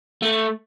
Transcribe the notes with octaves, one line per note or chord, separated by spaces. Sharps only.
A3